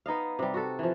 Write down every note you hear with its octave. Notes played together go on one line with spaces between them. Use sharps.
B3 D#4 D#5 F5
C3 G3
F#4 A4
E3 F3